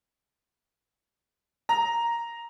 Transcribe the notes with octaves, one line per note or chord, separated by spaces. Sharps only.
A#5